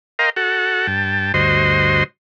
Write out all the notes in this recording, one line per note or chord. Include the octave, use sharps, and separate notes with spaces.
A#4 D#5 F5 G5 A#5 C6
F#4 A4 F#5
G2 G5 A5
D2 G2 F#4 C5 D#5 C6